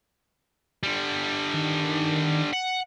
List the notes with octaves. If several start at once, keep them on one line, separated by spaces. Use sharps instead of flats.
D3 G3
D#3
F#5